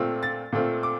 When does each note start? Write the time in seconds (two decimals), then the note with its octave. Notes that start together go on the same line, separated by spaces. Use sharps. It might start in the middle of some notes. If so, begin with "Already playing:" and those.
Already playing: A#2 A3 C4 F4
0.23 A6
0.52 A#2 A3 C4 F4
0.83 D6